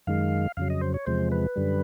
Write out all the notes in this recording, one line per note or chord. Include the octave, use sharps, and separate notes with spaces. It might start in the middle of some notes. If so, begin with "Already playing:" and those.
F#2 D#3 G#3 F5
F2 C#3 F#3 F5
D#5
C5
C#5
E2 C3 F3 G#3 C5
B4
F#2 D3 G3